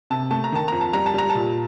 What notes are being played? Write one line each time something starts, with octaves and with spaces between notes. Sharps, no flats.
C3 A5
A3 A5
A#5
D#3 A5
F2 A#5
A5
G3 A#5
A5
G3 A#5
A5
A#2